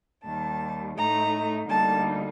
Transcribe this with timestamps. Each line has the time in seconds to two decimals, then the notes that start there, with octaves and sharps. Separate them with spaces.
0.24 D#2 D#3 G3 A5
0.96 A2 A3 D#4 A#5
1.68 D2 D3 G3 A#3 D#4 A5